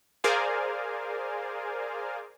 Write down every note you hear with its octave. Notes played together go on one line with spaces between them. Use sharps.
G#4 A#4 C5 D5 F5 G#5